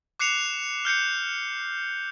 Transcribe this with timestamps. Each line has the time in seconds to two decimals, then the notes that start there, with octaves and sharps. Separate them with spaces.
0.19 D6 F#6 C7 C#7 F7
0.85 F6 G6 C7 C#7